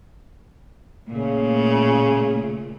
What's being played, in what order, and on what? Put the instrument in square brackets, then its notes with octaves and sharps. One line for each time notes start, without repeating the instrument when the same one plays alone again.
[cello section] A#2 A3 [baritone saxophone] C#3